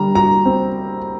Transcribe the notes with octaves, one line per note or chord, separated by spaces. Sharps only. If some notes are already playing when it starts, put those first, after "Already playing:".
Already playing: D3 G3 A#5
F#4 A#5
C4